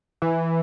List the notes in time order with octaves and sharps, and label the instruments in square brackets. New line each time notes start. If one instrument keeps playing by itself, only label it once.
[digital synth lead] E3